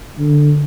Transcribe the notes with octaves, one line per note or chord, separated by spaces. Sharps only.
D3